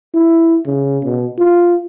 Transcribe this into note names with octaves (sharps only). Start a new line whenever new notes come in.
E4
C#3
B2
F4